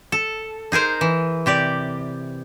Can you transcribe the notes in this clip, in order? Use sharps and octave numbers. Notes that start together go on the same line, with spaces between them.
A4
D#4 G#4 A#4 C5
E3
C3 G4 D5